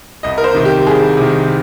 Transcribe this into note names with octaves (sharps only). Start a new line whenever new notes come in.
C2 D#5
A#4
C5
C3 D#3
G4
C2 G#4
C3 D#3